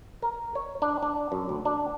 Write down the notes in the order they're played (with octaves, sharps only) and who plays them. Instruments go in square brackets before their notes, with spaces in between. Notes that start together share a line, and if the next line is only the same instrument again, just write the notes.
[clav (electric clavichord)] A#4
C#5
D4
D4
F#2
D2
D4